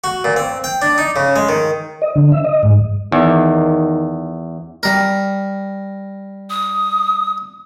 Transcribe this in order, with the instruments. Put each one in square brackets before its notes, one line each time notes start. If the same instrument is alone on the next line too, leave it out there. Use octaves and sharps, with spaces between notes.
[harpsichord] F#4
A#2
C4
G5
D4
D#4
C#3
G#3
D#3
[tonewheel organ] D#5
D3
E5
D#5
G#2
[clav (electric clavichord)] E2 [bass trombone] D#3
[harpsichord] G3 A#4
[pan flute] D#6